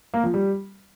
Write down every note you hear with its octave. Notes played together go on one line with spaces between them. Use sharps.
A#3
F3
G3